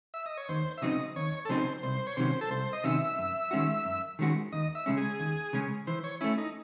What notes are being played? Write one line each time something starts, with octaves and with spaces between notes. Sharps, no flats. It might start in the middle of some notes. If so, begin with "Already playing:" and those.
E5
D#5
C#5
D#2 C5
E5
C#3 F#3 C4 D#4 D#5
D#2 C#5
A4
C#3 F#3 C4 D#4 C5
C2 C5
C#5
C3 D#3 F#3 C#4 C5
A4
C2 C5
D#5
C3 D#3 F#3 C#4 E5
F#2
D#3 G#3 C#4 F#4
F#2
D#3 G#3 C#4 F#4
D#2 D#5
E5
C#3 G#3 C#4
G#4
D#2
C#3 G#3 C#4
E3 C5
C#5
A3 C#4 E4
D#4